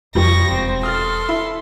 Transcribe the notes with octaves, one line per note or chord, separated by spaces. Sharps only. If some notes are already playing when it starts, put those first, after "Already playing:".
F2 F3 G3 A#3 C#6 A#6
E1 C4
A4 C6 D#6 F6 A6
E4